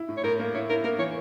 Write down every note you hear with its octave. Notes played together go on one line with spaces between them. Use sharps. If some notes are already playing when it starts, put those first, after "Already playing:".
Already playing: E4
A2
C#5
A2 A#4
A#3
E4 C#5
E4 A#4
A#3 A#4
E3 C#5